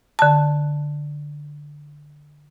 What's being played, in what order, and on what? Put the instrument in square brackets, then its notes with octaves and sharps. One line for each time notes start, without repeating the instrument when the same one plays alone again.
[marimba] D3 A5